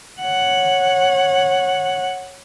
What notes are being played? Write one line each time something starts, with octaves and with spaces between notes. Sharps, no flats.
C#5 F#5